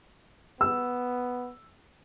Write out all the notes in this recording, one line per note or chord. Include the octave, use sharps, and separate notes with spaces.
B3 E6